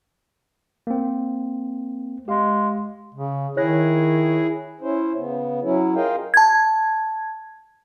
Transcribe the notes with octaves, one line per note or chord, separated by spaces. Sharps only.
A#3 C4
G#3 G4 F5
C#3
D#3 E4 G#4 C#5 F#6 A#6
C#4 E4 C5
C#3 B3
F#3 C#4 E4
F4 G#4 A#4 D#5 F5 G5
A5 G#6